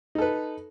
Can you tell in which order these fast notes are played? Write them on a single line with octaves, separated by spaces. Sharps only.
D#4 A4 B4